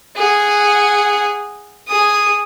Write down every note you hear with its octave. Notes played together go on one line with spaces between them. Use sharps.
G#4 F#5
G#4 D#6